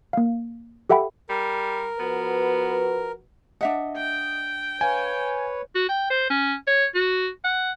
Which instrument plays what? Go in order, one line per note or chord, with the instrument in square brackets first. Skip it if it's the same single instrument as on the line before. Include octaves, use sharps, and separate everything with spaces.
[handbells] A#3 F5
G4 A4 E5 F#5 G5 B5
[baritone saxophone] G3 [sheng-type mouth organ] A#4
[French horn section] F3 F#4 B4 [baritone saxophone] B3
[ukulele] D4 E5 F#5 [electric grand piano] D#5
[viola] G5
[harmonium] B4 C#5 [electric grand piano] F5 G#5
[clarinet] F#4
G5
C5
C#4
C#5
F#4
F#5